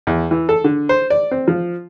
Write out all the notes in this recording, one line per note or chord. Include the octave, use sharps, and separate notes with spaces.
E2
E3
A4
D3
C5
D5
C4
F3